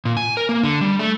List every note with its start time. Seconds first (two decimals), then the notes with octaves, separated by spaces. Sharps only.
0.05 A#2
0.17 G#5
0.37 A#4
0.49 A#3
0.64 D3
0.81 G3
0.99 A3